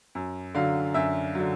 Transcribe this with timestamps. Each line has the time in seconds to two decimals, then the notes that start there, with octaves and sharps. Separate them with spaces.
0.15 F#2
0.54 D3 F#3 F5
0.94 F#2 E5
1.35 D3 F#3